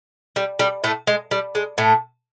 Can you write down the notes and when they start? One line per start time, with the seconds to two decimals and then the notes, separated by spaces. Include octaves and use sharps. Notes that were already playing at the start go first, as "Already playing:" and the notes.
0.36 G3
0.59 G3
0.84 A2 A3
1.07 G#3
1.31 G3
1.55 G#3
1.78 A2 A3